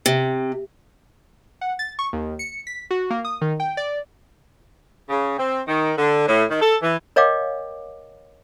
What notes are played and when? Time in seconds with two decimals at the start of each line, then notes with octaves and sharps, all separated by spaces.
0.06 C3
1.61 F#5
1.79 A6
1.99 C#6
2.13 D#2
2.39 C#7
2.67 B6
2.91 F#4
3.10 A#3
3.25 D#6
3.41 D#3
3.60 G5
3.77 D5
5.10 C#3
5.38 C4
5.67 D#3
5.97 D3
6.28 A2
6.50 D#3
6.61 A4
6.82 E3
7.16 A#4 C#5 D#5 F5 G5 D6